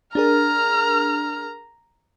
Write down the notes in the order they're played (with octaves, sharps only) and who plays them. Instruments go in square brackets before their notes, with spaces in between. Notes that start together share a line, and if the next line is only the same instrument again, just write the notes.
[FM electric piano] D4 G#4 A#4 [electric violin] A#5 [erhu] F6